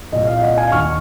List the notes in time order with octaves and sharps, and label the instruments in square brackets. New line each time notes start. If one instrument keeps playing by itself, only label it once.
[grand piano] C2 A#2 D#5
F5
D#5 F#5
F5 G#5
D#2 D#3 C#6 F6